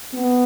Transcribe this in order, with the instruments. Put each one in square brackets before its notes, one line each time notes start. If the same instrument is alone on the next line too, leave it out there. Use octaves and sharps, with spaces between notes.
[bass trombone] B3